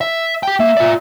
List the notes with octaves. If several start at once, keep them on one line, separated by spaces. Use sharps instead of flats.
E5
G4 G5
A#3 E5
F4 D5